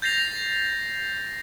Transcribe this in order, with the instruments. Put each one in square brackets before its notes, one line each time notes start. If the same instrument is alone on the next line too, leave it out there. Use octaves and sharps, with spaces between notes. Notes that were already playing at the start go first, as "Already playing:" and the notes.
[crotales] G6 A6 A#6 C7 F7